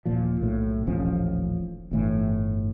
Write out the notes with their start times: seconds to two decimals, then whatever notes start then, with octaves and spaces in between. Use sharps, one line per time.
0.05 D#1 A#2 F3
0.41 B1 A2
0.86 D#1 A1 F3 C#4
1.91 G1 A2 E3